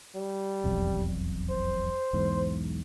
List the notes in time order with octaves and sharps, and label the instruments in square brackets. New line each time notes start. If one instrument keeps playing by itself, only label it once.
[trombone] G3
[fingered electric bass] E1 B1 F2
[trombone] C5
[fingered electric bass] B1 E2 G#2